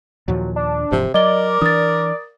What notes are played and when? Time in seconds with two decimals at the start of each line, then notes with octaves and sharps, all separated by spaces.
0.28 D#2 A#2 F3 F#3
0.56 D4
0.92 E1 G#2 C3 F3
1.14 F#3 A#4 D5 D#5 G7
1.61 E3 D4 D#6 A6